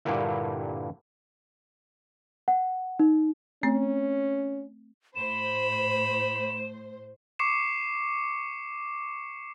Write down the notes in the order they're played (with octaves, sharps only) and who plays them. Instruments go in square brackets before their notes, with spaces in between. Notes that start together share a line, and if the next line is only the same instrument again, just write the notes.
[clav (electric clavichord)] G2 A#2 D3 G3 A#3 E4
[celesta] F#5
D#4
[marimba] A3 C4 [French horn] C#4
[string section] A2 C5 [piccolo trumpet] B5 [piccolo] E7
[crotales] C#6 D6 C7 C#7 E7